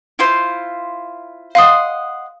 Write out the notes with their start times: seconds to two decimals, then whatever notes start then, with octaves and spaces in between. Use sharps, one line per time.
0.19 E4 F4 C5
1.55 D#5 F5 F#5 C6 D#6